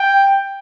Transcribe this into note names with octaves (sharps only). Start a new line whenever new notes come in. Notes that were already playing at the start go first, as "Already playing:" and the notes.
Already playing: G5